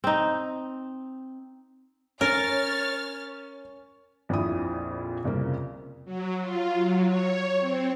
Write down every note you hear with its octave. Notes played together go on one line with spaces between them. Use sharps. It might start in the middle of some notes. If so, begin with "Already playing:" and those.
C4 D#4
C#4 A#4 C#5 F6 A6
A#1 F2 A#2 F3 E4 D#6
C2 F2 C#3 A#3
F#3
F4
F#3
C#5
C4